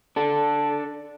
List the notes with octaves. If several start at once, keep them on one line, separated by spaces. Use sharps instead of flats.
D4 A4